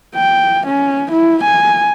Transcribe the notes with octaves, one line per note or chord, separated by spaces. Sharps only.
G5
C#4
E4
G#5